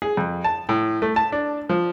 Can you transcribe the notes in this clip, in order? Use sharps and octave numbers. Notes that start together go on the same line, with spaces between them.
G#4
F2
A5
A2
A3
A5
D4
F3